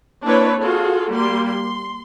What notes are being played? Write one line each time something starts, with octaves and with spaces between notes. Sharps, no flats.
A#3 C4 D4 E4 B4 C#5
F4 F#4 G#4 A4
G3 A#3 G4 C6
C6